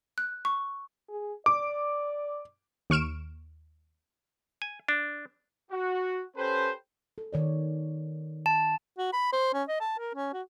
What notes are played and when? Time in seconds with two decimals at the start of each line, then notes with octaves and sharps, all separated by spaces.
0.18 F#6
0.45 C#6
1.09 G#4
1.46 D5 D6
2.90 D#2 C#6 F6 D7 E7
4.62 G#5
4.88 D4
5.71 F#4
6.37 C#4 G4 A4 B4 C5
7.18 A4
7.33 D#3 C#5 D5
8.46 A5
8.98 F#4
9.13 B5
9.33 C5
9.54 C#4
9.69 D#5
9.80 A5
9.99 A#4
10.15 C#4
10.33 F#4